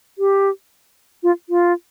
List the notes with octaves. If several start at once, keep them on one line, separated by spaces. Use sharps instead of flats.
G4
F4
F4